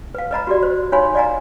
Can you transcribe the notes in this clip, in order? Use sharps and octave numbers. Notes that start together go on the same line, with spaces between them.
B4 F5
B4 D#5 A#5 B5
F#4 G4 D5
C5
D#4 C#5 F5 G#5 B5 C6
D5 D#5 F5 G#5 A#5